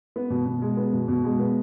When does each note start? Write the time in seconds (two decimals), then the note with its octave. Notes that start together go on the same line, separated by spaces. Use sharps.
0.16 B3
0.30 B2
0.46 B2
0.62 G#3
0.77 B3
0.93 B2
1.08 B2
1.24 G#3
1.39 B3